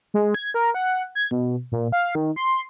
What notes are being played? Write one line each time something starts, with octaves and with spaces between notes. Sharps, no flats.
G#3
G#6
A#4
F#5
G#6
B2
A#2
F5
D#3
C6